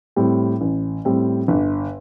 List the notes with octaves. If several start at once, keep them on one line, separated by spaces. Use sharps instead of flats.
A2 G3 C4
A1
A2 G3 C4
G1